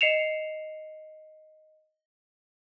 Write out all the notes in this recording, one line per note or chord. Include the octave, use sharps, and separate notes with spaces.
D#5 C7 C#7 E7 F7